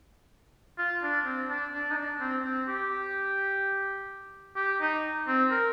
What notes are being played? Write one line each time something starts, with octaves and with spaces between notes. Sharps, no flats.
F4
D4
C4
D4
D4
D#4
D4
C4
C4
G4
G4
D#4
C4
A#4